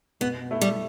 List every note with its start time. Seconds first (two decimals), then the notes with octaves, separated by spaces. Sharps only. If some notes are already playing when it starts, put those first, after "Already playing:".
0.21 B2 B3
0.51 A3 E4
0.61 G3